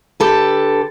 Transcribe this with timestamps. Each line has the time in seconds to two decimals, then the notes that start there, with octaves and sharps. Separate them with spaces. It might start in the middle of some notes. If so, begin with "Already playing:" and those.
0.20 D3 G4 A4 B4